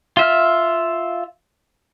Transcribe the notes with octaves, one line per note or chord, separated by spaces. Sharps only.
F4 E5 F6